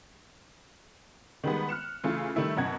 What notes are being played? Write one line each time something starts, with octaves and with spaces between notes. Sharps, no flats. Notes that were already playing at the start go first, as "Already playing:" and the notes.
D#3 G3 G#3 B3
F6 F#6 C#7 E7
C#3 E3 A3 F4
D#3 G3 A3 E4
F#2 B2 F#5 G#6